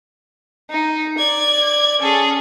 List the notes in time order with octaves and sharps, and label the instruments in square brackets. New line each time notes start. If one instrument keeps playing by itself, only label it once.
[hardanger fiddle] D#4
[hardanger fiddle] D5 [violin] G#6
[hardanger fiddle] C#4 [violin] G#4 A4